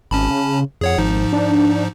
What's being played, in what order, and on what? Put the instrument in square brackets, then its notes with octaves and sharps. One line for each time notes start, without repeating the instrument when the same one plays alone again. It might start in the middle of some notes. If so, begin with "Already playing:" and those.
[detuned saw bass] G#1 [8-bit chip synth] C#4 A5 B5
[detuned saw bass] C#3
[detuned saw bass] F2 [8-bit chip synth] G#4 C#5 F#5
[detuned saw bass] G#1 [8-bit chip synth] G#2 F3 D#4
[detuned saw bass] D4